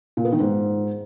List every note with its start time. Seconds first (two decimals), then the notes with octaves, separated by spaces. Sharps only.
0.17 A#2
0.25 B3
0.32 D#3
0.40 G#2